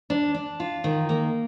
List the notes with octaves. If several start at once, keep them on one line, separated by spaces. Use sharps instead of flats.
D4
D4
F4
D#3
A#3